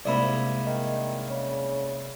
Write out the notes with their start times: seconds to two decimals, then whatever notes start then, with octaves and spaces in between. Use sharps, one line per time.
0.05 C2 G#2 A#3 D5 E5 B5
0.66 D#3
1.29 C#3